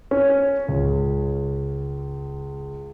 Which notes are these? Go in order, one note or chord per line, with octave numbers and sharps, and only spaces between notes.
C#4
C#2